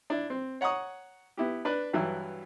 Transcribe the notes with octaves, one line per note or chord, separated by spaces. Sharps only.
D4 E4
C4
C#5 F#5 A#5 C#6 D#6
B3 E4 G4
D4 B4 F#6
G2 E3 F#3 E4